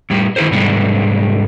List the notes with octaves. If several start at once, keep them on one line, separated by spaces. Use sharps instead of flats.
A2 G3 G4
D#3 E4 G#4 A#4 C5
G#2 C3 G3 A3 B3 D4